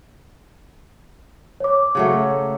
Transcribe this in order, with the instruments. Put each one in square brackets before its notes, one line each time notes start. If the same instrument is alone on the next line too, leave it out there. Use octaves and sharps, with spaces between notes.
[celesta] C#5 D6
[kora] C#3 F#3 A3